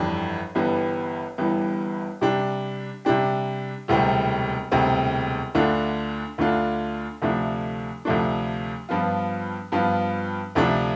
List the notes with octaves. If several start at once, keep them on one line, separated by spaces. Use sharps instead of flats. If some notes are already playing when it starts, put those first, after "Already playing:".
Already playing: G1 F2 E3 G3 D4
G1 G2 E3 G3 B3
G1 G2 E3 G3 B3
C3 G3 D4 G4
C3 G3 D4 G4
E1 D2 C3 G3 C4
E1 D2 C3 G3 C4
D2 D3 A3 D4 F4
D2 D3 A3 D4 F4
D2 C3 F3 A3 D4
D2 C3 F3 A3 D4
G2 F3 B3 F4
G2 F3 B3 F4
D2 C3 F3 A3 D4